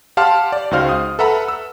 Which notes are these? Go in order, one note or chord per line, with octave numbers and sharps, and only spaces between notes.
G4 F5 F#5 A5 C6 F6
D5
C#2 D#4 F#4 C5 F5 F6
D#6
A4 B4 E5 F#5 A#5 B5
E6